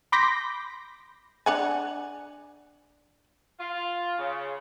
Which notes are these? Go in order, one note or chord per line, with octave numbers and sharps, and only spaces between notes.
B5 C6 D6 G6 A#6 B6
D4 F#5 G#5
F4
C#3